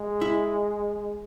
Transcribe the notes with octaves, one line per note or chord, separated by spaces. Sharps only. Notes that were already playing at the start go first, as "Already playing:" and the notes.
Already playing: G#3
E4